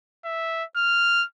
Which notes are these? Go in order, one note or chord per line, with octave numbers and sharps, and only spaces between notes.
E5
F6